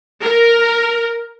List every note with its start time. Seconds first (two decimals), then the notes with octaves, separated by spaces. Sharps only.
0.21 A#4